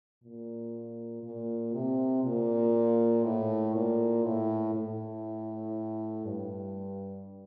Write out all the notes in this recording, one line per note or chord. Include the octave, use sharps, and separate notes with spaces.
A#2
A#2
C3
A#2
A2
A#2
A2
A2
G2